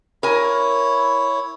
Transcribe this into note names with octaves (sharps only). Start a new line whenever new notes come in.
E4 A#4 C#5 G#5